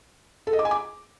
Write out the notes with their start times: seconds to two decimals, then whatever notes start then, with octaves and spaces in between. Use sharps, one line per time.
0.47 A4
0.53 D#5
0.59 D6
0.65 G#5
0.71 D6